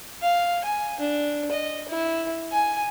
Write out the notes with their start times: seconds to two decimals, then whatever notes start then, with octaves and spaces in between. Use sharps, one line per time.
0.22 F5
0.64 G#5
1.00 D4
1.52 D#5
1.89 E4
2.52 G#5